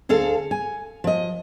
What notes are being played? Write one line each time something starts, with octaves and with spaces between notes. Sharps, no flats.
D2 G#4 A4 F5
G#5
F3 D#5